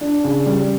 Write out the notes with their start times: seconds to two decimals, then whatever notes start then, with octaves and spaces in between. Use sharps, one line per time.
0.01 D4
0.24 C#3
0.46 G3